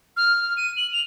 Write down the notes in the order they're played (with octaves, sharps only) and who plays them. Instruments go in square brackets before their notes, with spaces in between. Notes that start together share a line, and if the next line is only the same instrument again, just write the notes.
[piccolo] F6
D#7
F#7
F7